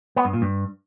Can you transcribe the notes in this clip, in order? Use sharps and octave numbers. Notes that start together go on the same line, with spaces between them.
B3
G2
A#2
G2